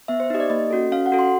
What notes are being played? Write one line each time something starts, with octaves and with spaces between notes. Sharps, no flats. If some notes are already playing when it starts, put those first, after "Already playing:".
B3 E5
C5
D#4 G4 D#5
D5
A#3 D#5
C#4 F#4 A4
C#4 F5
F#5
F#4 A4
C6